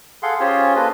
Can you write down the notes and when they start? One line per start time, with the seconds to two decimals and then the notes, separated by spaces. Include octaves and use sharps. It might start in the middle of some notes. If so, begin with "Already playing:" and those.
0.23 G#4 A4 F5 F#5 C6
0.40 C#4 F4 G4 G#4 C5 C#5
0.76 A#3 D4 A4 B4 C5 D#5